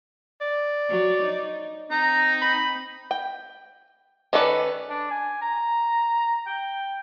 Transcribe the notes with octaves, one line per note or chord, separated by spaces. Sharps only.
D5
F#3 C#5
D#4
C4 D#4 A#5
B5
G5
D#3 C#4 A4 B4 D5
D4
G#5
A#5
G5